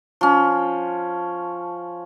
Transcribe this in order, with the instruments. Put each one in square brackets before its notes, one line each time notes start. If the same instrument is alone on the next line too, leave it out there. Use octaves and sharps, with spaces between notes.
[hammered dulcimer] F3 C#4